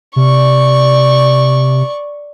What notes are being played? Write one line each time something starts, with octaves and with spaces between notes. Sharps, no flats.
C3 D5 C#6